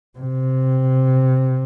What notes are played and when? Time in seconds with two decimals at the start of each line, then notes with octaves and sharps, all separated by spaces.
0.19 C3